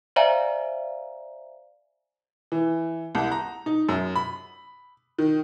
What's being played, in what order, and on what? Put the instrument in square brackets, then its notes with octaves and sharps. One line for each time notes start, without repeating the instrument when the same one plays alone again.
[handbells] C5 D5 E5 F5 G#5 A#5
[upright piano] E3
C2
A#5
D#4
F#2
B5
D#3